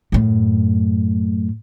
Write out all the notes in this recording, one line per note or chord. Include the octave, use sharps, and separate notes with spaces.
F#2 A2